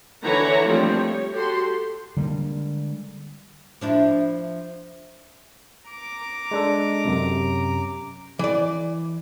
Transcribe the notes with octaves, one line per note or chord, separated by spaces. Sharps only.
D3 E3 E4 C#5 F#5 A#5
F3 G3 A3 A#3 C4 D4
C#5
F#4 G4 A4 C6
D3 G3 G#3 A#3
F3 D4 E4
A#5 D6
G#3 D4 A4
F#2 C3
E3 D5